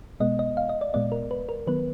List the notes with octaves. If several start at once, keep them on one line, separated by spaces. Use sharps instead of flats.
B2 G#3 B3 D#5
D#5
F5
D#5
D5
A#2 G#3 B3 D5
A#4
B4
A#4
D#3 F#3 B3 B4